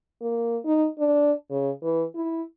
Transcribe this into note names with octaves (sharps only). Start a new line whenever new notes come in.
A#3
D#4
D4
C#3
E3
E4